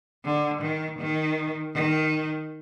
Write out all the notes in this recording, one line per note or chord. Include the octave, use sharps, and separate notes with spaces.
D3
D#3
D#3
D#3